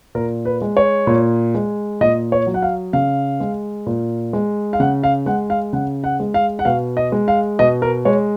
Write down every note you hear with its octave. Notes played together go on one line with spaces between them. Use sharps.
A#2 A#4
B4
G#3
C#5
A#2
G#3
A#2 D#5
C#5
F#3
F#5
F5
C#3 F5
G#3
A#2
G#3
F5
C#3 F#5
F5
G#3 F#5
F5
C#3 F#5
F#5
G#3
F5
F#5
B2 F5
D#5
G#3
F5
B2 D#5
A#4
G#3 C#5